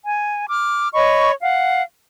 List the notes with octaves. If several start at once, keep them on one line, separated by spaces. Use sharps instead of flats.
G#5
D6 F6
C#5 D#5 B5 C#6
F5 F#5